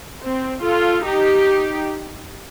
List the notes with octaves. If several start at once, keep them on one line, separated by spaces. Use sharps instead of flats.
C4
F4 A4
D#4 G4